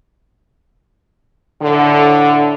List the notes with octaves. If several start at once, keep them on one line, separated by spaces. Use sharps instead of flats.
A2 D3